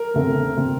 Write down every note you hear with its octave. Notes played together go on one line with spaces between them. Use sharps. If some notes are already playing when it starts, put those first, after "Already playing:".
Already playing: A#4
E2 D3 A3 C4
D3 A3 C4